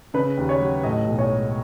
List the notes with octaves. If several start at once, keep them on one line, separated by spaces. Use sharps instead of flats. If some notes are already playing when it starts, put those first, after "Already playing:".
C#3 B4
D#2
C#5
F#3
A2 D#5
B1
C#5
G#3